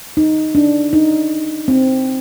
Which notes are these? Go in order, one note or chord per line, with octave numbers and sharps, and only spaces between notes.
D#4
D4
D#4
C4